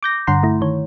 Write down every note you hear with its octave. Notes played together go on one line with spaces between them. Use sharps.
D6 G6 A#6
G2 D3 F#5 A#5 C6
A3 E4
D#3 C#5